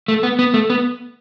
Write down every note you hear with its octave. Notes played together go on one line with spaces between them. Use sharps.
A3
B3
B3
A3
B3